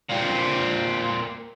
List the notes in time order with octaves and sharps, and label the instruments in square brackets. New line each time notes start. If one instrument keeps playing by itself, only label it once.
[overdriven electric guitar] A#2 C4